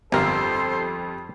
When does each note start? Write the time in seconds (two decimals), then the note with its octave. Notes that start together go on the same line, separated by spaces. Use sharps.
0.12 G1 F2 G4 A4 A#4 C5 E6